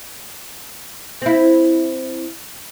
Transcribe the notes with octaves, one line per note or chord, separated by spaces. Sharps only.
C4 E4